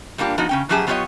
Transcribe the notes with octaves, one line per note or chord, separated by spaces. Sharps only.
G3 A#3 D4 F4 G4
F3 B3 D#4 F#4
C#3 C#4 G5
F#2 F3 F#3 G4 G#4 A5
F#3 B3 F4 G4 C#5 D#5